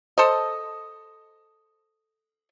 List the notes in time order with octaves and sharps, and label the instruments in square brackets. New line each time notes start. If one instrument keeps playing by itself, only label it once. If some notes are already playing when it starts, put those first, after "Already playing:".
[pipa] A4 C5 D#5